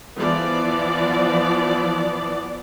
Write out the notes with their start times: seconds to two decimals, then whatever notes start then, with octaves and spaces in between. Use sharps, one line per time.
0.18 E3 F3 B3 D5